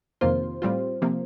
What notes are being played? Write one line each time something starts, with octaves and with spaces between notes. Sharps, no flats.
F2 C3 D#3 A#3 F4 C5
A2 G3 C4 F4
C3 F3 A#3